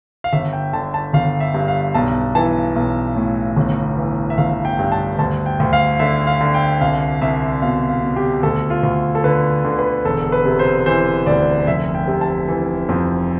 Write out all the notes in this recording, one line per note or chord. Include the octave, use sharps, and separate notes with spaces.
F5
G1 E5
G5
D3 A5
A5
G1 F5
E5
G2
F5
B1 A5
E3 A5
B1
A2
G1
E3
E5
G1 F5
G5
G2
A5
D2 A5
G5
D2
F5
D3 E5
F5
D3
G5
C2 F5
C2 E5
B2 F5
F5
B2
G4
D2 A4
F4
D2
A4
D3 B4
D3
B4
E1 A4
B4
C3
C5
E3 C5
D2 D5
F1 E5
G5
C3
A5
E3
F2